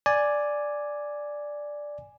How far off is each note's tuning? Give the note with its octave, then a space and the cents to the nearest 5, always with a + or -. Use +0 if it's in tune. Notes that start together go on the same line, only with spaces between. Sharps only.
D5 +0 G#5 +0